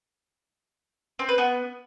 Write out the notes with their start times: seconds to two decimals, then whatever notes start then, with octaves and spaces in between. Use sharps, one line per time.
1.19 C4
1.29 B4
1.38 B3